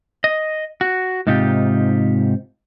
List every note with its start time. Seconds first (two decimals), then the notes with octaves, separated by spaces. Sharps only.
0.24 D#5
0.81 F#4
1.27 G#2 C3 D#4 F4 G4